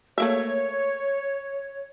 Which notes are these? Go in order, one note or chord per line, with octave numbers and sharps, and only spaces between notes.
A3 A#3 C#5 E5